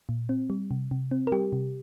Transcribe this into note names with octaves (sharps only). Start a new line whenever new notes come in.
A#2
C4
G3
C3
C3
C4
A#4
G3 G4
C3